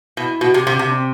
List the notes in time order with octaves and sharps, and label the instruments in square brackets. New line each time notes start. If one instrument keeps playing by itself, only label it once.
[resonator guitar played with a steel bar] B2 [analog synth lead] E4
[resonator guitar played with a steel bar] B2 [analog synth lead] F#4
[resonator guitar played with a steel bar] C3 [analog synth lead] G4
[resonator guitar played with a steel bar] C3 [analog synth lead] F#4
[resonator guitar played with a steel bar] C3 [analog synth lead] D4
[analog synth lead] C4